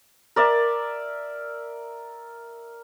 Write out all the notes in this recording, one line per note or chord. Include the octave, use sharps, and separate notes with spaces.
A#4 D5 E5